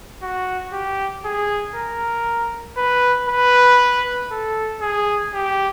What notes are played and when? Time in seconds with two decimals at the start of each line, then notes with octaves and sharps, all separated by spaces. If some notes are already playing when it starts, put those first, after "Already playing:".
0.23 F#4
0.73 G4
1.25 G#4
1.76 A#4
2.77 B4
3.29 B4
4.31 A4
4.82 G#4
5.34 G4